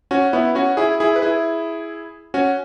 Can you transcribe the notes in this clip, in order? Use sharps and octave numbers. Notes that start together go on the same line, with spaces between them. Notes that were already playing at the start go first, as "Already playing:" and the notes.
C#4 F#4
B3 E4
C#4 F#4
E4 G#4
E4 G#4
B4
E4 G#4
C#4 F#4